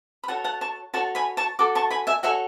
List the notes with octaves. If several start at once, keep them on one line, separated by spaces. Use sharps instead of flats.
B5
F#4 A4 C#5 F#5 A5
F#5 A5
A5 C#6
F#4 A4 C#5 A5 C#6
G#5 B5
A5 C#6
F#4 A4 D6
A5 C#6
G#5 B5
E5 G#5
F#4 A4 C#5 E5 G#5